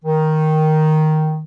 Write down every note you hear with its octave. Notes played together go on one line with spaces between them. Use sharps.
D#3